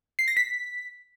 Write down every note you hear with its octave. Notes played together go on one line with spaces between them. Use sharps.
C7
A#6
B6